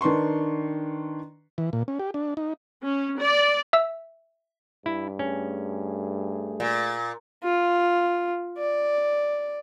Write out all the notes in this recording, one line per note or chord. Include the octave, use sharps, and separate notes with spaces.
D#3 D4 B4 C6 C#6
E3
A#2
C#4
G4
D4
D#4
C#4
D5
E5 E6
G2 E4
A3 C#4 G#4
A#2
F4
D5